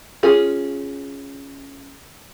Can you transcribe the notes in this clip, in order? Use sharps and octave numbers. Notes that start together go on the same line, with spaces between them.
C#4 F4 G#4